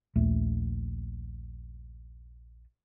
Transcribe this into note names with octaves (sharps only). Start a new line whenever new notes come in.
A#1 D#2 A3